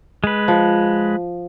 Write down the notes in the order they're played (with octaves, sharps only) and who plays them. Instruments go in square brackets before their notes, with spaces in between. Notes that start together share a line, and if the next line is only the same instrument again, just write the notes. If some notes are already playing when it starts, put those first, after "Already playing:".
[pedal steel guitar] G#3 B4
[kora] F3